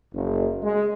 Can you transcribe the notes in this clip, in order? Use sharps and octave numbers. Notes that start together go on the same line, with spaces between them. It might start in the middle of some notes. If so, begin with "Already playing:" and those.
F#1
G#3